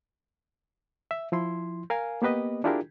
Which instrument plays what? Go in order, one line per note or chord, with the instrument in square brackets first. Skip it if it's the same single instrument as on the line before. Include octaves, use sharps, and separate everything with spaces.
[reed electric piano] E5
F3 E4 C6
A#4 F5 G#5
A#3 B3 G4 B4 D#5
D4 E4 F4 G4 G#4 A#4